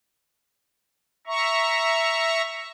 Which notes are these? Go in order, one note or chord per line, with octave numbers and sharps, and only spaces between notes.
E5 A#5 C#6